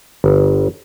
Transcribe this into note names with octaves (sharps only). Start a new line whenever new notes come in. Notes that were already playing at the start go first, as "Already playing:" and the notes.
G1